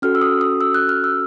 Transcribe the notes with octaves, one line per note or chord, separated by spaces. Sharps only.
C#4 F#4 A4 F6
E6
D#6
D#6
E6
F#6
F6
E6